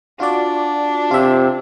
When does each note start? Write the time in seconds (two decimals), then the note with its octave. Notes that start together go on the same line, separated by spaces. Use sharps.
0.20 D4 F4 F#4 D5
1.11 C3 F4 E5